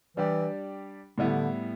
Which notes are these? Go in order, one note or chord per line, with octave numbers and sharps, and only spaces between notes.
E3 G3 D4 G4 D5
A2 D3 G3 B3 E4